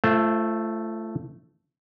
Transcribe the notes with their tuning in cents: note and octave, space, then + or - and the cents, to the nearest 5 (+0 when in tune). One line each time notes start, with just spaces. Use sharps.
A3 +0 F4 -35 C5 +0